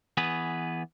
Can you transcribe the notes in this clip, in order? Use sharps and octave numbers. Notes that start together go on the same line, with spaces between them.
E3 B3 G#4 B4